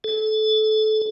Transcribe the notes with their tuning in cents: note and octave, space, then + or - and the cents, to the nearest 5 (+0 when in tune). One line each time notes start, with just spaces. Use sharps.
A4 -25